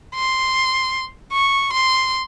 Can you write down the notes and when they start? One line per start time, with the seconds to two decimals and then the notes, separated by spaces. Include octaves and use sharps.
0.15 C6
1.33 C#6
1.72 C6